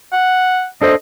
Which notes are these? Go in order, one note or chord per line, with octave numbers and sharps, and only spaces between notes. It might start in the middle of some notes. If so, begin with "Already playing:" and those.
F#5
D4 A4 C5 D#5